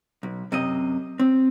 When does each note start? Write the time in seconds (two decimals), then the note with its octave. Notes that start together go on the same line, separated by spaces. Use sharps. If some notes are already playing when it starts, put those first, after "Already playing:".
0.23 B1
0.52 F#2 C3 D#5
1.20 C4